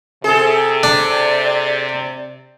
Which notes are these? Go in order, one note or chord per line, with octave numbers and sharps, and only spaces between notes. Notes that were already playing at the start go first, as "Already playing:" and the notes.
C3 G#4 A4
D4 D5